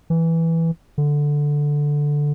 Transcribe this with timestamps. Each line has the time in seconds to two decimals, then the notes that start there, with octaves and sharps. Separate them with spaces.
0.10 E3
0.98 D3